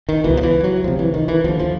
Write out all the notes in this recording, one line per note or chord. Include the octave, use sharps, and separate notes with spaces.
D#3
C#2 B2 E3
F3
E3
F#3
D2 C3 F3
E3
D#3
E3
D#2 D3 F3
F3